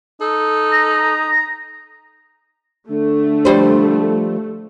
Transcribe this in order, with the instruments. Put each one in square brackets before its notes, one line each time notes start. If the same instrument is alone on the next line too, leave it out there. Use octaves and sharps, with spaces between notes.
[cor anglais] D#4 [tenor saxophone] A4
[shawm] A#5
[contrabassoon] D3 [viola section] A3
[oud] F3 G3 C5